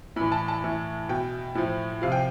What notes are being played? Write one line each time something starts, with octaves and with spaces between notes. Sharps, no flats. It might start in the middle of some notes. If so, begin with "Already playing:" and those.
A2 E3 B5
A5
A5
A2 E3
B2 G5
A2 F3
C3 F3 F5
G5